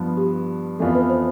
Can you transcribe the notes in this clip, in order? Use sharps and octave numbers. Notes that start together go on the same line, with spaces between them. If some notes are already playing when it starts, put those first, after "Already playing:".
Already playing: G2 F3 B3
G4
F2 E3 B3 F4 A4
B4
C5